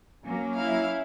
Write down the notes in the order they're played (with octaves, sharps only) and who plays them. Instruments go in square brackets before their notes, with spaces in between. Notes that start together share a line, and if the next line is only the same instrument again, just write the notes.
[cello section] F#3 A#3 [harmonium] C#4
[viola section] E4 [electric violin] F5